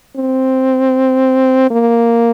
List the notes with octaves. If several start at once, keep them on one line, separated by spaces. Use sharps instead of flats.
C4
A#3